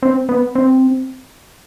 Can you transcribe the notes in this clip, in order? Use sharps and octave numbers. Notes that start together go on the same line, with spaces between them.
C4
B3
C4